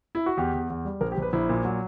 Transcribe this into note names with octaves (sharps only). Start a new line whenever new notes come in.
E4
F#4
E2 G4
E2
E2
G3
A#1 A#4
G4
A#1 B4
A#1 E4
A#2
F#3